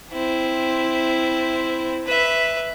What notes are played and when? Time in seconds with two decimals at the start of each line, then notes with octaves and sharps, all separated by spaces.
0.12 C4 E4
2.06 B4 E5